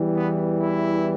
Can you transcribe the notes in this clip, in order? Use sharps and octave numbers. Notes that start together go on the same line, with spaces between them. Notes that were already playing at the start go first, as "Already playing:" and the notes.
Already playing: E2 E3 G3
B3
E4